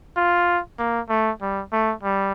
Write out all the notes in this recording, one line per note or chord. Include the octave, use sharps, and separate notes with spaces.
F4
A#3
A3
G3
A3
G3